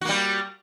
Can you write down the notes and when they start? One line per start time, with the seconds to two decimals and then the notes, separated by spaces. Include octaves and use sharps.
0.01 F#4
0.05 A#3
0.09 G3